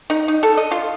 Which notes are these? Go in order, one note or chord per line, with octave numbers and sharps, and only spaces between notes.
D#4
D#4
A4
D#5
F4